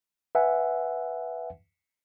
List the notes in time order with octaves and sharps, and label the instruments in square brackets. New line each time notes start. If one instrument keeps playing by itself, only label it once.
[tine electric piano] B4 E5 F#5 G#5